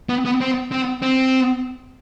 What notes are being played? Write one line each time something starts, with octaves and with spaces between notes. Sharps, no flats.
B3
B3
C4
C4
C4